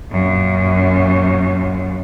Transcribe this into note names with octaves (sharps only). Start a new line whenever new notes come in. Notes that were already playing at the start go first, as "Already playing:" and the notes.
F#2 A#2